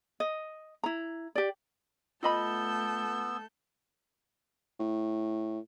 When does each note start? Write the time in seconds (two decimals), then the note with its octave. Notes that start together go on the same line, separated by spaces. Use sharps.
0.20 D#5
0.84 E4 A#5
1.35 G4 D5
2.23 A3 B3 F4 A4 D#5 B5 E6 G6
4.80 A2